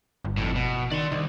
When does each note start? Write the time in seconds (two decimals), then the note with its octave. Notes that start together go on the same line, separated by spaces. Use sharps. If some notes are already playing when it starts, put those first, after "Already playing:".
0.25 G1
0.37 F2 A2
0.55 B2
0.91 D#3 D5 C6
1.12 C2 D#3